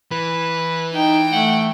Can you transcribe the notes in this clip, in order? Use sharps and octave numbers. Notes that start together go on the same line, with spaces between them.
E3 B4
D#4 G5
A3 F#5